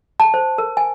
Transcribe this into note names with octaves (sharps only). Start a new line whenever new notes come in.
A5
C5
A#4
G#5